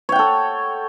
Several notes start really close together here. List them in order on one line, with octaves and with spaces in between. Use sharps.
C#5 G5 F#5 A4